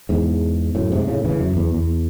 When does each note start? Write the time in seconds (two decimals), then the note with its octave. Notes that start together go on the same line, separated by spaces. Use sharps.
0.09 E2 G#2
0.75 F#2 A2
0.92 G#2 C3
1.08 A2 C#3
1.24 C#3 E3
1.41 F#2
1.57 E2
1.74 E2